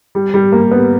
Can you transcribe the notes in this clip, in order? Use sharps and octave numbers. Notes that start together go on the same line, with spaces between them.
G3
G3
A#3
B3